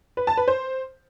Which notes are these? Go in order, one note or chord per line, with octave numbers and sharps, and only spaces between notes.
B4
A5
B4
C5